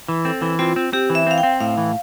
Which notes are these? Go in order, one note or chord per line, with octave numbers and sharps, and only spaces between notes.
E3
C4 A4
E3
C4 F4
C4
C4 G4
E3
E5
C4 F5
G5
C4
A2 F5
E3